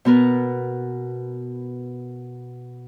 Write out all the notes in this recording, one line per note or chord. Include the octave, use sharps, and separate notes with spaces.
B2 B3 A#4 B4